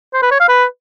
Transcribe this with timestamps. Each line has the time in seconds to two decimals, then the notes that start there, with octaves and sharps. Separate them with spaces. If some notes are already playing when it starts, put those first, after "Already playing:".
0.14 C5
0.22 B4
0.31 C#5
0.40 F5
0.49 B4